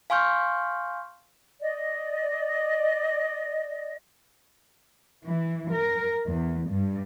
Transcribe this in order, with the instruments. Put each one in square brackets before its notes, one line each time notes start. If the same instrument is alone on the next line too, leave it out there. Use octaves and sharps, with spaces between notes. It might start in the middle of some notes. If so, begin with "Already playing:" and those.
[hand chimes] F5 G#5 C6 C#6 F6 G6
[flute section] D5 D#5
[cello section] E3
A#4
E2
G2